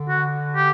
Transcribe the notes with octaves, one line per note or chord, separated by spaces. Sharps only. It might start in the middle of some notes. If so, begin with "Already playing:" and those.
Already playing: D3
F#4
G4